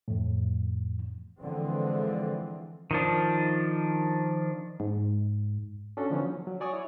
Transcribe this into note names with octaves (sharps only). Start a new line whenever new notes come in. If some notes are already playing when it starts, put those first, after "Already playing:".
F2 A2
D3 E3 F3 G#3 C4
D#3 F3 D4
G#2
C#4 D4 F#4 A4
D3 F3 B3 C#4 D#4
F#3
F#3
F#4 C#5 D5 G#5 C#6 D#6
E4 C#5